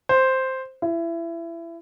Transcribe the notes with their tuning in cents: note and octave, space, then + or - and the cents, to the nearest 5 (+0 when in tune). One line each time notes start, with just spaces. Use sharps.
C5 +0
E4 +25